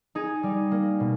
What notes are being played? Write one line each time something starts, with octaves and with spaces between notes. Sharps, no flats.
D#4 G#4
G3
A#3
B2